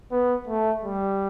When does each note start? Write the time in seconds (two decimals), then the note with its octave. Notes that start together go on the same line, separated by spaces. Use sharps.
0.12 B3
0.48 A3
0.83 G3